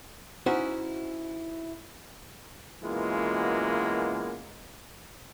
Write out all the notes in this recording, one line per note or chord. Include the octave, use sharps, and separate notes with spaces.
C#4 D#4 E4 F#4 C5
F#2 B2 E3 G#3 A#3 F4